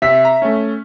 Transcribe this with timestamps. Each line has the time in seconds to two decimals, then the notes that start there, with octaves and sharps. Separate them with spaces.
0.02 C3 E5 B6
0.25 A#5
0.42 A3 C#4